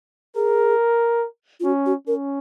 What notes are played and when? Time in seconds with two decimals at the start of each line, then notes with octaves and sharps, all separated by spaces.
0.36 G#4 A#4
1.60 F4
1.64 C#4 F#4
1.86 F#4
2.07 C#4 A#4